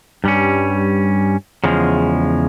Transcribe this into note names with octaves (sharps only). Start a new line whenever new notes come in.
G2 G3 C#4
E2 C#3 F3 G#3